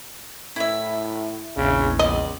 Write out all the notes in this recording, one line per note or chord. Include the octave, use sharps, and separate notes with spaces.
A2 E4 E5
A#1 E2 C#3
C#2 D5 D#5